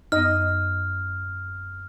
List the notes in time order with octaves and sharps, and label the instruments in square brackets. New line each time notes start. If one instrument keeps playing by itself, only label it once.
[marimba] F#2 B3 [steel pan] D#4 D#5 [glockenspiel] F6